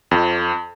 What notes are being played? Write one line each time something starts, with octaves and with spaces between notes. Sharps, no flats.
F2